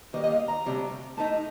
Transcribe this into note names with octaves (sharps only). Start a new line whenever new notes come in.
D#2 D#3 G3 A#3 D#5
D#5
F5
A#5
D2 C3 G3 D4
A2 A3 D#4 A5